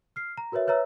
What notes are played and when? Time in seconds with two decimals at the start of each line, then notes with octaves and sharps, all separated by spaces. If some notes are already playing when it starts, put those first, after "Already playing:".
0.16 F6 C7
0.38 A#5
0.52 F#4 A#4 B4 C#5 E5
0.67 B4 C#5 E5 A#5 E6